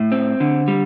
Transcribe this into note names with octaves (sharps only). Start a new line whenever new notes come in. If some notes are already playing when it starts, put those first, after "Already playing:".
Already playing: A2
C4
D3
G3